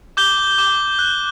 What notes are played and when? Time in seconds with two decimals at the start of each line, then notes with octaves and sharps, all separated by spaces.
0.17 D6 G6 G7
0.58 D6
0.99 F#6